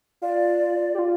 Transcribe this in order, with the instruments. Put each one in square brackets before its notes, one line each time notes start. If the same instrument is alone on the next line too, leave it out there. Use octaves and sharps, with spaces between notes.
[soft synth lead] F4 [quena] D5
[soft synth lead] G4
F4